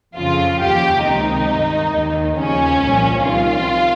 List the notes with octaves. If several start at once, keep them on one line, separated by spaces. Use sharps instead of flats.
F2 C#3 F3 F4
D#2 C#3 F3 G4
C#2 C3 D#3 D#4
G2 D#3
D#2 D#3
D#2 C#3 F3 C#4
C2 A#2 F3
C2 C3 D#3 F4